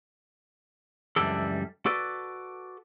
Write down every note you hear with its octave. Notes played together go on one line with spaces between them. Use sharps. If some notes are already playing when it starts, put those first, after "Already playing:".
C#2 F#2 E3 G3 D4 A4
F#4 A4 B4 D5